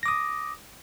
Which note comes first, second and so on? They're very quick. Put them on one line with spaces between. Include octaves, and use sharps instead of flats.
A#6 D6 D#6